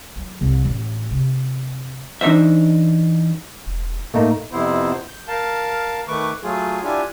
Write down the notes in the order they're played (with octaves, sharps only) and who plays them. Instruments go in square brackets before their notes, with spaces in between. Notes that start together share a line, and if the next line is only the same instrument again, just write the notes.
[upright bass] F#3
C2
A1
C3
[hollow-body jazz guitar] E3 D4 D#4 C5 E5
[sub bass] E1
[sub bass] A2 [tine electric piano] A3 A#3 D#4
[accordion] F2 C3 B3 E4 C5
G6
A#4 F5 A5
D#3 A3 B4 C#6 D6
F#3 A3 F4 G#4
D4 E4 F4 G4 G#5